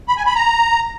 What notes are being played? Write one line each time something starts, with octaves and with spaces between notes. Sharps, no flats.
B5
G#5
B5
A#5